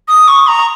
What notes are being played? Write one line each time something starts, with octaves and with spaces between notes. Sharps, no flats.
D#6
C#6
A#5